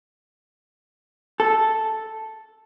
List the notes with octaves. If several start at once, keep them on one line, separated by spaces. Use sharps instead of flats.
A4